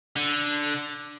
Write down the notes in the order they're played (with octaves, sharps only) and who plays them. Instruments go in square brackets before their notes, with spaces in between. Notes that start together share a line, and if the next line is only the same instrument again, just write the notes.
[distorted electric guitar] D3